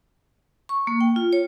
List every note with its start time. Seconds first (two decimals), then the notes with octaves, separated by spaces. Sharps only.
0.69 C#6
0.87 A#3
1.01 G5
1.16 F4
1.33 C#5